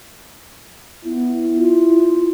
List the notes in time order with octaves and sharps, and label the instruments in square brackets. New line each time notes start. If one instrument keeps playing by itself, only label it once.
[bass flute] B3 [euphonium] E4
[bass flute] F4